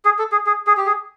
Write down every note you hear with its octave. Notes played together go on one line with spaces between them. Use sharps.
G#4
A4
G#4
G#4
G#4
G4
G#4